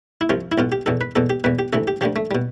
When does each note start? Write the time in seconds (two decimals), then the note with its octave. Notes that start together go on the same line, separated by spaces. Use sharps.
0.21 E4
0.29 C2 C3 F3 F4
0.52 E4
0.58 B1 B2 F4
0.72 G4
0.86 E2 B2 A4
1.01 B4
1.16 E2 B2 A4
1.30 G4
1.44 E2 B2 B4
1.59 G4
1.73 D2 C3 E3 A4
1.88 G4
2.01 D2 D3 F3 G4
2.16 A3
2.31 B2 G3